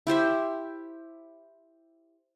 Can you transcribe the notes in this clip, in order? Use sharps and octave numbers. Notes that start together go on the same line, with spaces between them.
E4 G4 C5 E5